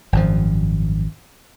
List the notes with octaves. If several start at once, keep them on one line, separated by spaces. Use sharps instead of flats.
G#1 F#2 F3